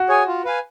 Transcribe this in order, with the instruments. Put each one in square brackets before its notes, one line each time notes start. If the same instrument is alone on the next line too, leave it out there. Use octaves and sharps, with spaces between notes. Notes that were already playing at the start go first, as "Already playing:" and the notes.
Already playing: [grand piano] F#4
[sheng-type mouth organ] G#4 C#5 G#5
F4
B4 F5 G#5